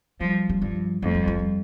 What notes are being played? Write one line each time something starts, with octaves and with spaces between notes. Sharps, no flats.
F3 G3
G3
G2 F3
F2 A3
G3
F3
G3